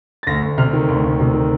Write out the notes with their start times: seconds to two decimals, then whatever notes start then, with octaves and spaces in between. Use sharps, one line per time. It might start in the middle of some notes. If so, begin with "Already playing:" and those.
0.23 A6
0.27 D2 A#6
0.42 D2
0.58 C3 F6
0.73 D#3
0.89 D2
1.04 D2
1.20 C3
1.34 D#3